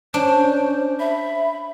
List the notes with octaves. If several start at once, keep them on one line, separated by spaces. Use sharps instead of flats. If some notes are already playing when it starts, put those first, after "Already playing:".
C#4 D4 C5
E5 B5